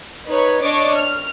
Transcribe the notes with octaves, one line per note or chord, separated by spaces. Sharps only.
D#4 B4 C#5
D4 C#5 D#5 C#6 D6
F6